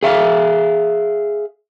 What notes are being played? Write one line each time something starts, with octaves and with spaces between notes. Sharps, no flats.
G#4 E5 F5